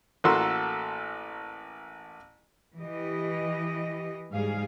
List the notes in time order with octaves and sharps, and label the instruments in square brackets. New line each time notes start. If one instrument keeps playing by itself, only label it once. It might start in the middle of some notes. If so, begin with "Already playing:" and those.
[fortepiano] A1 A#3 F#4 A4 C6
[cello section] E3 G4 D#5
G#2 G3 G#4 F5